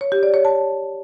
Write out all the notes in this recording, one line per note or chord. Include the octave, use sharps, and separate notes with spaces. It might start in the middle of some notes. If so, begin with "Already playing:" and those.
C#5
G4
D5
C#5
A5